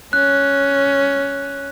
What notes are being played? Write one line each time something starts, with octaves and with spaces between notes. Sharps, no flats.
C#4 F#6